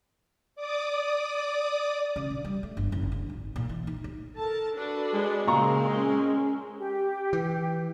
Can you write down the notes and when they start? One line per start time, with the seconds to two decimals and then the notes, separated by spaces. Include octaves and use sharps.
0.55 D5 D6 D#6
2.16 C#3
2.31 A#1
2.44 G3
2.63 A3
2.77 G1
2.92 F#1
3.12 D3
3.30 G#1
3.56 A#2
3.69 E3
3.87 D#4
4.04 D2
4.37 A4 A#4 A5
4.75 D4 F#4 A4 B4
5.14 G#3
5.47 A#2 C#3 C4 A#4 A#5 C#6
5.91 C#4
6.80 G4
7.33 E3